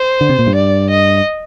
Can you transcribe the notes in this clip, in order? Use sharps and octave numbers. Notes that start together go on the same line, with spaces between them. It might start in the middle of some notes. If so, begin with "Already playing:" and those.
Already playing: C5
D3
C3
A#2
G2
D5
D#5